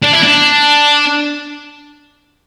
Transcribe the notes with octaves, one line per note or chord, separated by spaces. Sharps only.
D4
E4
D4